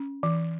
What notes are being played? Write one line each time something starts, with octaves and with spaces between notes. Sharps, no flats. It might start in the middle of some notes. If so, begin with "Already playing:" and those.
Already playing: C#4
E3